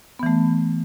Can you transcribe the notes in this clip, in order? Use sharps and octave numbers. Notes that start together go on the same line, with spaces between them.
E3 A3 B3